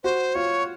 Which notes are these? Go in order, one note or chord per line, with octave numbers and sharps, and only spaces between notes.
F#4 C5
F4 C#5